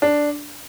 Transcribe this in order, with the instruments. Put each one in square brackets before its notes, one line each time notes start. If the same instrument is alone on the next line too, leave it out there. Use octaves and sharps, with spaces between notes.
[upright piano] D4